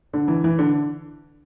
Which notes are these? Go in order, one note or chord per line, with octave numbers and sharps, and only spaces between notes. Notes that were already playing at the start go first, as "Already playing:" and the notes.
D3
E3
E3
D3